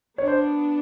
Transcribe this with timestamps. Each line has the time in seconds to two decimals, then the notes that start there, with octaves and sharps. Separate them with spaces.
0.18 B3 D4 C#5
0.28 C5